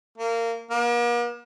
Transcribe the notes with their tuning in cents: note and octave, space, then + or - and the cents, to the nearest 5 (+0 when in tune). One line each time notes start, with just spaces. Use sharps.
A#3 -20
A#3 +45